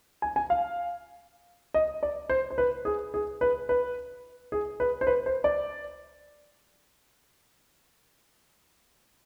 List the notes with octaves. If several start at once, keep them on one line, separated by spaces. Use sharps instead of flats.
G#5
G#5
F5
D#5
D5
C5
C5
B4
G#4
G#4
B4
B4
G#4
B4
C5
B4
C5
D5